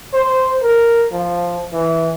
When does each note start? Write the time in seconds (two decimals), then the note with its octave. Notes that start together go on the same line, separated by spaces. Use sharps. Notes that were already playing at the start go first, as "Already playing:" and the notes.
0.13 C5
0.62 A#4
1.12 F3
1.73 E3